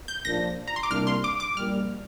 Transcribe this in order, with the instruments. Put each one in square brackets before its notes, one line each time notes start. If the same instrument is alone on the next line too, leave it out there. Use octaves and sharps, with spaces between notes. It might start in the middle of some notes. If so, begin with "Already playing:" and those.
[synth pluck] G6
[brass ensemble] A#1 A#2 F3 D4 F4 [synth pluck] A#6
[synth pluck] A#5
C6
D6
[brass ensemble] C2 C3 G3 A#3 D4 [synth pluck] F6
[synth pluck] C6
D6
D6
[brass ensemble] A#1 A#2 G3 [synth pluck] F6